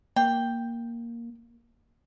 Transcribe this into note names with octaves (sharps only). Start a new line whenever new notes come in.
A#3 G5